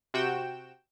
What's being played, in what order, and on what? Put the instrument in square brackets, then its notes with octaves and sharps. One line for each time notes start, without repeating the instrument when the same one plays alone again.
[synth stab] C3 F#4 G5 E7